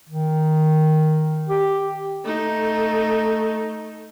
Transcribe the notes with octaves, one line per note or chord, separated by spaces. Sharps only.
D#3
G4
A3 D#4